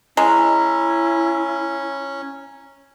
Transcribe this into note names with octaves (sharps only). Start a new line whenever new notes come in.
G#3 C#4 E4 A#5